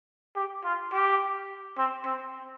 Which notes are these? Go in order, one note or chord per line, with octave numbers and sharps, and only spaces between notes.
G4
F4
G4
C4
C4